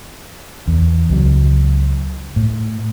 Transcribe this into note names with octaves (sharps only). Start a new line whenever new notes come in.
E2
C#2 F#3
A2